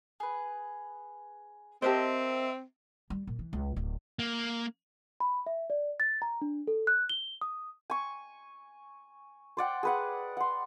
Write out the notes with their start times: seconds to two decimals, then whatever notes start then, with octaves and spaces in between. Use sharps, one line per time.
0.20 G#4 B4
1.82 C4 G4 A#4 C5 D#5 E5 A5
3.10 G3
3.27 A#2
3.39 E3
3.53 C#2
3.76 D1
4.19 A#3
5.20 B5
5.47 E5
5.70 D5
6.00 A6
6.22 A#5
6.42 D4
6.67 A4
6.87 F#6
7.10 G7
7.41 D#6
7.90 G#5 C#6
9.57 C5 D5 F#5 G5
9.83 G#4 B4 F#5
10.37 F#5 C6